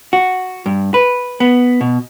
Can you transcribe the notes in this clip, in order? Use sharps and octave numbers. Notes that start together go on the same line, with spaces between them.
F#4
G2
B4
B3
B2